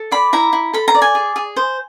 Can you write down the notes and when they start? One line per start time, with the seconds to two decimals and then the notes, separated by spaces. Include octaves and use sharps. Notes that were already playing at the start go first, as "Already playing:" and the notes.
Already playing: A4
0.11 D5 B5
0.33 E4 A#5
0.53 E4
0.73 A4 B5
0.88 A#5
0.95 D5
1.02 G#5
1.15 G#4
1.36 G#4
1.56 C5